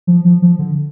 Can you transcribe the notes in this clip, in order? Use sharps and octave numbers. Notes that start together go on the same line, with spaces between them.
F3
F3
F3
D3